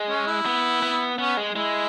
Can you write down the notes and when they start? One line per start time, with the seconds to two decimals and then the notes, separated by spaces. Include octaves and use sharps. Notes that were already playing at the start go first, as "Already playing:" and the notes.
Already playing: G#3
0.09 C#4
0.27 E4
0.46 B3
0.82 B3
1.18 B3 C#4
1.37 G#3
1.55 G#3 E4